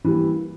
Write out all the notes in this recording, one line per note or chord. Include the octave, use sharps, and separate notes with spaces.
E3 G3 A#3